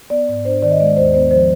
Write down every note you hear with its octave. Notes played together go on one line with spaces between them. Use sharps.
B3 D5
G#2
D4 C5
D#3 D5
D#5
G#3 D5
D#2 C5
B3 C5
F3 C5